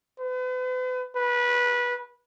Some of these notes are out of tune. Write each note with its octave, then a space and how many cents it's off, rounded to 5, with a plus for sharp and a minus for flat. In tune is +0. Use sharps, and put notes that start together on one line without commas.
B4 +40
B4 -20